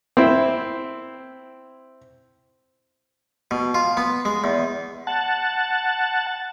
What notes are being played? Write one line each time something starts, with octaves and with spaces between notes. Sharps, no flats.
C4 E4
B2
F4
B3
G#3
E2
F#5 A5